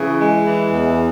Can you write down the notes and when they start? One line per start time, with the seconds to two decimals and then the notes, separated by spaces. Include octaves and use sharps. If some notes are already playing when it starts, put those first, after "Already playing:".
Already playing: C#3 E3
0.20 G#3
0.47 E3
0.73 E2